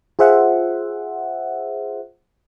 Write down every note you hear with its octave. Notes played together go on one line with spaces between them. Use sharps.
F4 G#4 C5 E5 F#5